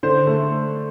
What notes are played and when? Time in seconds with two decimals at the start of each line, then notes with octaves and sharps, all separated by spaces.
0.03 D3 C5
0.27 A3